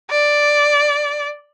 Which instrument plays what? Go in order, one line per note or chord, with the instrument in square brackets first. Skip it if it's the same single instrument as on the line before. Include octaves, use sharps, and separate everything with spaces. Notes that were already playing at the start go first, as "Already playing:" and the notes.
[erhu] D5